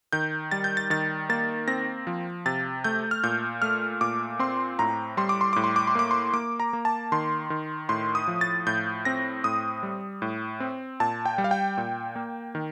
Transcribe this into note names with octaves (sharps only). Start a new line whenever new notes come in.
D#3 G6
G3 A6
G6
A6
D#3 A6
A#3 A6
C4 A#6
F3
C3 A6
A3 G6
F6
A#2 G6
A3 F6
A#2 D6
C4 C6
A2 A#5
G3 C6
D6
C6
A2 D6
C6
D6
C6
A#3 D6
C6
A#3 D6
A#5
A#3
A5
D#3 C6
D#3
A2 C6
D#6
F3
A6
A2 G6
C4 A#6
A2 D#6
G3
A2
C4
A#2 A5
G5
G3
F5
G5
A#2
A#3
D#3